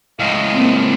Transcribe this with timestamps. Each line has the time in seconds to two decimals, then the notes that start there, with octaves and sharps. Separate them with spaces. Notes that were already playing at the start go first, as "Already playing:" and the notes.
0.19 C#2 A2 D#5 F5
0.54 A#3 C4